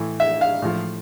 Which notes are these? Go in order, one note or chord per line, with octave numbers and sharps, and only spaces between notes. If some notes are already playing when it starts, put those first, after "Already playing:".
Already playing: A2 E3
E5
F5
A2 F3